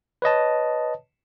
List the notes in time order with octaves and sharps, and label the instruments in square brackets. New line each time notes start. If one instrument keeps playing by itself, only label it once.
[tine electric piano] B4 C#5 D#5 A5